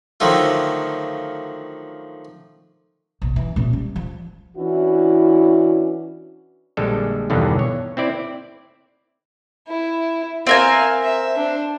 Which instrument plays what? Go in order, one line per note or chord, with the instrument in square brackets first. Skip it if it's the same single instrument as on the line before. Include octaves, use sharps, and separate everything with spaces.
[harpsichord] D3 D#3 F3 F#3 A3 F4
[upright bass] A#1 B2
E3
A#2 C#4
G3
F3
[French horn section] E3 C#4 D4 E4 F#4
[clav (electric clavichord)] A#1 D3 G3 G#3 A4
B1 E2 G2 B2 D3 D#3
C#5
C4 E4 D5
[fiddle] E4
[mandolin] C4 A#4 G#5 [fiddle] E5 F5
[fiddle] E5
D4 C5